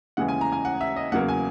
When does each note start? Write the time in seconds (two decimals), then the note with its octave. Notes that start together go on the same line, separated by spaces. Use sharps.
0.17 D#2 C#3 E3 G#3 F#5
0.28 G#5
0.41 A#5
0.52 G#5
0.65 F#5
0.81 E5
0.96 D#5
1.12 E2 C#3 F#3 A#3 F#5
1.28 G#5